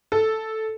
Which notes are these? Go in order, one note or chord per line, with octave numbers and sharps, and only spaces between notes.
A4